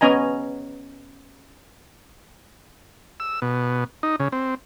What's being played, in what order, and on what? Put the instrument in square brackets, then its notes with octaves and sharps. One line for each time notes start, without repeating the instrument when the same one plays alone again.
[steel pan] B3 C#4 D#5 G#5 A#5
[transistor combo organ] E6
B2
D#4
C#3
C4